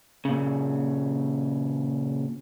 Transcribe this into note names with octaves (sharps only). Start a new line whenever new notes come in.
A#2 C#3